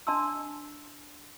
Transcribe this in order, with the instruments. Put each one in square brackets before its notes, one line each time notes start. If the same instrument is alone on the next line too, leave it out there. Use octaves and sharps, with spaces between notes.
[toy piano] D4 D#5 A5 C6 E6